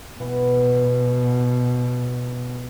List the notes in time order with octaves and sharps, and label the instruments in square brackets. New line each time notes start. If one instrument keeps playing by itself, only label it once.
[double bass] B2 [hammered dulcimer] E3 B3